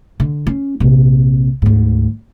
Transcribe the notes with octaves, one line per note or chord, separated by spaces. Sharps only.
D3
C#4
A#1 C3
D2 G#2